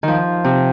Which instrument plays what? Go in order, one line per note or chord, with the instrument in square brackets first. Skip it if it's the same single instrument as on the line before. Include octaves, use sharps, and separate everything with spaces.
[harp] D#3 F3
C3